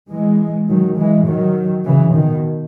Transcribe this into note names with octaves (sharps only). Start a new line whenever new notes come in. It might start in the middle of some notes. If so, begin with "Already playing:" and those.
E3 G#3
D#3 F#3
E3 G#3
D#3 F#3
C#3 E3
B2 D#3